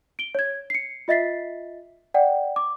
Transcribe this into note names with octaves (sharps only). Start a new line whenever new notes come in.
D7 G7
C#5 G#6
C7 C#7
F4 D#5 E5 A6 B6 C7
D5 F#5 G5
D6